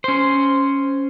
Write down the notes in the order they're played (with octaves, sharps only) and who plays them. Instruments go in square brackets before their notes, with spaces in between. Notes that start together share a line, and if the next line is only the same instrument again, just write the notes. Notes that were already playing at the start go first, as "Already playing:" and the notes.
[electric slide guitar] C#4 C5